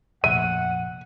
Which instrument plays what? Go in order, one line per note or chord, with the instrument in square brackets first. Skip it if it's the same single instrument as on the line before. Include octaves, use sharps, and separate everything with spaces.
[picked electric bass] F1 A#1 [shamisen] E5 [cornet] F#5 [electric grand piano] D#7